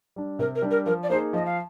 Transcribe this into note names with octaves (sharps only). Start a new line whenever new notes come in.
G3 D4
C3 A#4
A#4
G3 D4
A#4
F3 A#4
D5
A#3 D#4 G#4 C5
F3 D#5
F5